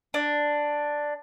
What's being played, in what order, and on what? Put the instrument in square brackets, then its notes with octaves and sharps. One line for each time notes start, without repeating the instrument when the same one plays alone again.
[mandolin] D4